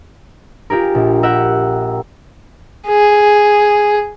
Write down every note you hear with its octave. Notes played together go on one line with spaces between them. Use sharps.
F4 G4 G#4 A#4
A#1
G4 A#4 E5 F#5
G#4